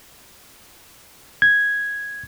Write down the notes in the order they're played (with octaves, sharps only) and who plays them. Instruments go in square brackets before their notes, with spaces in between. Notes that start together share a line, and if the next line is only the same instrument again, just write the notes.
[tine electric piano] G#6